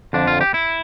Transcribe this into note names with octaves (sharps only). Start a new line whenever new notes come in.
F2 D3 F3 D4
F4
G4
E4